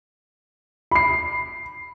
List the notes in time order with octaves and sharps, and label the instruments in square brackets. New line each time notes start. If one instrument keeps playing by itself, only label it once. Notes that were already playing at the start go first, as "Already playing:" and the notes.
[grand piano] B5 C7